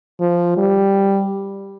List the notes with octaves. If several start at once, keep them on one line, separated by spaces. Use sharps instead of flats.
F3
G3